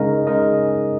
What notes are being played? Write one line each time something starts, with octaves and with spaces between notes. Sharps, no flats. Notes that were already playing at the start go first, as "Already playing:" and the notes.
Already playing: C#3 G#3 D#4 A#4 D#5
C#3 G#3 D#4 A#4 D#5